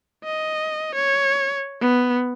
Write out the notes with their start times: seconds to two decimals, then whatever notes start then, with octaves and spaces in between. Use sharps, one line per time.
0.24 D#5
0.95 C#5
1.81 B3